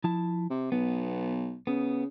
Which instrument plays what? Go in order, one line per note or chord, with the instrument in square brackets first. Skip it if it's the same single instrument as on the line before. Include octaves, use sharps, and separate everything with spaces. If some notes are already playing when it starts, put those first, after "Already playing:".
[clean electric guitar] F3 E4 A5
[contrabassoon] C3
[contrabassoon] B1 [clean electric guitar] B3
[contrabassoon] C#3 [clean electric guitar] B3